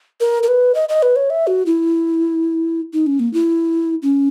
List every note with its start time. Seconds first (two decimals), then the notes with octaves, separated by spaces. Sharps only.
0.20 A#4
0.43 A#4
0.48 B4
0.75 D#5
0.89 D#5
1.02 B4
1.16 C#5
1.30 E5
1.47 F#4
1.66 E4
2.93 D#4
3.06 C#4
3.20 A#3
3.33 E4
4.02 C#4